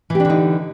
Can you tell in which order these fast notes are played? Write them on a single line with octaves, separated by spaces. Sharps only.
E3 G4 D4 D3 D#4